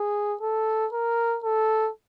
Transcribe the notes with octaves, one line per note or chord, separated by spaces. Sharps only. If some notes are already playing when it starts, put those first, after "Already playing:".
Already playing: G#4
A4
A#4
A4